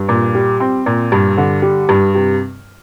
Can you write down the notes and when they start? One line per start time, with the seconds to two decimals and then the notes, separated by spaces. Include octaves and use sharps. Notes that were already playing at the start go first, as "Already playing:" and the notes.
Already playing: G2
0.09 A#2
0.35 G3
0.60 C4
0.86 A#2
1.12 G2
1.37 D3
1.62 G3
1.89 G2
2.15 C3